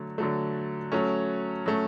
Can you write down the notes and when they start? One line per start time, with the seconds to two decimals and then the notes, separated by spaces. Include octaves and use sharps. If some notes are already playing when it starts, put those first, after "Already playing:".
Already playing: D3 F#3 A3
0.18 D3 F#3 A3
0.92 F#3 A3 C#4
1.66 F#3 A3 C#4